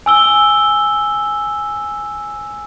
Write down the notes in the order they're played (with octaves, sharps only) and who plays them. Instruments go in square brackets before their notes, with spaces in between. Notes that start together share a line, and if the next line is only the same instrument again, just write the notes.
[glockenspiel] G#5 E6 G7